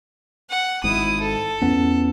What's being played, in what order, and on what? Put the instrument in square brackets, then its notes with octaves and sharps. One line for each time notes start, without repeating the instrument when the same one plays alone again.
[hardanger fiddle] F#5
[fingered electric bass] G#1 G#2 [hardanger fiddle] E4 D#6
[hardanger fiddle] A4
[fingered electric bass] E2 B3 C#4